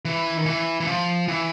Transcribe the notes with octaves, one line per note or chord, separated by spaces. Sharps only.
E3
D#3
E3
E3
F3
E3